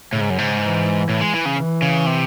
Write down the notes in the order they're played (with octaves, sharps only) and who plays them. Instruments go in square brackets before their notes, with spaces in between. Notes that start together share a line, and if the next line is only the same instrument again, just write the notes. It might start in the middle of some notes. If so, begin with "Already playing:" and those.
[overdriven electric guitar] A2 [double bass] C#3
[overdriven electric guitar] G#2
F#2
G#2
[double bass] E3
[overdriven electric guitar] A2
G#3
E3
C#3
[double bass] E3
[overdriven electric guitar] C#3
C3